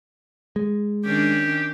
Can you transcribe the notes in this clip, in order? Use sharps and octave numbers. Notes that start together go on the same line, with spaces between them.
G#3
D#3 C#4 D4 G4